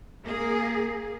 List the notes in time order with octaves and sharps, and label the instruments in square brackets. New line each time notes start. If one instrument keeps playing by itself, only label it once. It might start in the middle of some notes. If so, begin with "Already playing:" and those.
[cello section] A#3 G#4